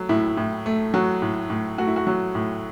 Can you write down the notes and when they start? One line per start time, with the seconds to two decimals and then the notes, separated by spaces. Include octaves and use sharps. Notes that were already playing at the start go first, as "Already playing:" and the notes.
Already playing: F#3 A3
0.09 A2 E4
0.37 A2
0.66 A3
0.94 F#3 F#4
1.22 A2
1.50 A2
1.78 A3 F#4
1.87 E4
1.96 F#4
2.07 F#3
2.35 A2